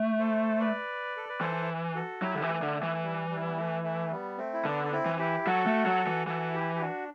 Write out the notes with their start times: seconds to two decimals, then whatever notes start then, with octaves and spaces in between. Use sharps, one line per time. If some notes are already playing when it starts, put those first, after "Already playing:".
Already playing: A3
0.19 A4 C5
0.60 B4 D5
1.17 A4
1.29 B4
1.41 E3 A4 C5
1.95 F#4 A4
2.22 F#3 E4 G4
2.35 D3
2.42 E3
2.49 A3
2.62 D3
2.76 A3
2.83 E3
3.03 G3
3.30 G3
3.47 B3
3.57 A3
3.84 A3
4.11 G3 B3
4.38 A3 C4
4.54 E4
4.65 D3 B3 D4
4.84 D4
4.92 C4 E4
5.06 E3
5.19 E4 G4
5.46 F#3 F#4 A4
5.66 A3
5.86 F#3
6.07 E3
6.27 E3 F#4 A4
6.54 E4 G4
6.75 G4
6.81 D4 F#4